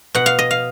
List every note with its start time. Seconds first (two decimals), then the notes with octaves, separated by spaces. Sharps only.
0.15 B2 F#5
0.26 F5
0.39 D#5
0.51 F5